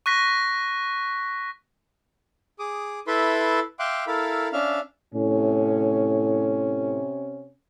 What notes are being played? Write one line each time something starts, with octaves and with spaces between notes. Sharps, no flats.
C#6 F#6 A#6 B6
G#4 D6 D#6
E4 A4 B4 E5 B5 C6
E5 F5 G5 C6 D6 F#6
E4 A4 A#4 F5 B5
C#4 D4 E5 F5 F6
A2 C3 C#4